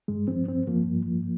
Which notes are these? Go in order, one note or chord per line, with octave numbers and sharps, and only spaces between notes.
G2 G#3
F3 C4
G2 C4
F3 A#3
G2
F3